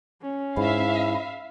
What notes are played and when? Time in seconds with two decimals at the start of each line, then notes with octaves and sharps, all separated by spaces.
0.22 C#4
0.57 G#2 E4 E5 F5